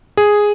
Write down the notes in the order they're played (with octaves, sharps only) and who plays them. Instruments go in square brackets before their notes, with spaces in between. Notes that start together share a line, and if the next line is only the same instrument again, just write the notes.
[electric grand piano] G#4